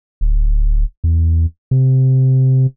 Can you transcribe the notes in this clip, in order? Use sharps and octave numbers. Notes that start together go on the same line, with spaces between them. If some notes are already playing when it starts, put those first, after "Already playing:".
D1
E2
C3